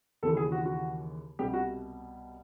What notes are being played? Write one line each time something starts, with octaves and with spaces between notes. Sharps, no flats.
D#2 C#3 E3 A4
G#4
F#4
F#4
C2 B2 G3 G4
F#4